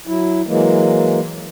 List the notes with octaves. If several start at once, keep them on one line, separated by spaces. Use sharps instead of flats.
F#3 E4
E3 F#3 G#3 A#3